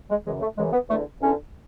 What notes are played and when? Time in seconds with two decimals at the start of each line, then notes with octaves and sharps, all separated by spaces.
0.10 G#3
0.25 F#2 C#3 E3 G#3
0.41 A3
0.57 F#2 C#3 E3 G#3
0.73 B3
0.89 E2 D3 A3
1.20 E2 D3 C#4